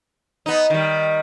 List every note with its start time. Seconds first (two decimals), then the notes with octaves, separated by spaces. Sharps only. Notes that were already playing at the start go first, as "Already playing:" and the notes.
0.46 B3 D#4
0.70 D#3 G3